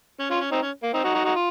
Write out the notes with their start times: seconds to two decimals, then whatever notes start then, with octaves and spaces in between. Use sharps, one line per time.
0.20 C#4
0.30 C#4 F4
0.41 C#4
0.52 C4 D#4
0.62 C#4
0.83 A#3
0.94 C4 D#4
1.04 D#4 F#4
1.14 D#4 F#4
1.25 D#4 F#4
1.36 F4